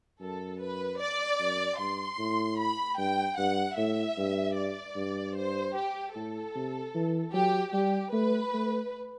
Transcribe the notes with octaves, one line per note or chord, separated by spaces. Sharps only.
F#2 A4
B4
D5
F#2
G2 C6
A2
B5
G2 G5
G2 F#5
A2 E5
G2
D5
G2
C5
G4
A2 A4
C3
E3
F#3 G4
G3 G4
A3 B4
A3